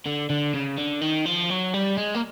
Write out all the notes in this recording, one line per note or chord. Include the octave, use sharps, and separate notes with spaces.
D3
D3
C#3
D3
D#3
F3
F#3
G3
G#3
A#3